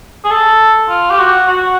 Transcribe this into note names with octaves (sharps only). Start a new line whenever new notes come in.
G#4
A4
F4
G4
F#4
F#4